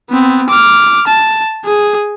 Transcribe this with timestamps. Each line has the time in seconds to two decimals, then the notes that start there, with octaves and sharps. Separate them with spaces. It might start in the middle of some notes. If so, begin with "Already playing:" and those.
0.10 B3 C4
0.49 D6 F6
1.07 A5
1.65 G#4